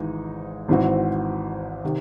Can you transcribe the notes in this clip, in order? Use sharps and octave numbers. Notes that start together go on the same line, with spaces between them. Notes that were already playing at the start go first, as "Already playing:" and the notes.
Already playing: G#1 G#2 E3 G#3 D#4
G#1 G#2 E3 C4 F#4
C3 D#3